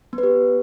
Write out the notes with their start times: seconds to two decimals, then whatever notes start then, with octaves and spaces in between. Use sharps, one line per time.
0.13 B3
0.18 B4
0.23 G4